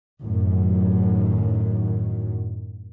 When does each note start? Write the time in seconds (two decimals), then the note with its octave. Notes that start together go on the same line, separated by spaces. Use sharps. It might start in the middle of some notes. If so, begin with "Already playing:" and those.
0.24 F#2 A2 D#3 F#3